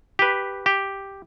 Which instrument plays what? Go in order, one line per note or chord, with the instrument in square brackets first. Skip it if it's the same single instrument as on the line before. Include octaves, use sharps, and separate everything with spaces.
[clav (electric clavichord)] G4 B4
G4